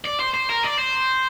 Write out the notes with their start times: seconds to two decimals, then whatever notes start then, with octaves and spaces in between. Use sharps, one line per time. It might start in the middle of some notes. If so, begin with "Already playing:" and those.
0.06 D5
0.20 C5
0.34 C5
0.49 A#4
0.63 D5
0.78 C5